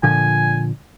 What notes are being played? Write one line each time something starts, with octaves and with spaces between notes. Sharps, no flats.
A#2 D3 F3 G#5